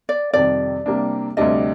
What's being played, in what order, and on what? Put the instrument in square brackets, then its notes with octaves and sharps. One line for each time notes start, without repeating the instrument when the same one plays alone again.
[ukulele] D5
[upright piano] F2 C3 D#3 G3 [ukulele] D5
[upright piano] C3 G3 A#3 D4
[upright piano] D2 C3 G3 D4 [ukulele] D#5